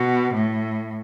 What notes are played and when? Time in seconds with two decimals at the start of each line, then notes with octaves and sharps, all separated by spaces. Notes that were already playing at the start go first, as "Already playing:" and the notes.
Already playing: B2
0.34 A2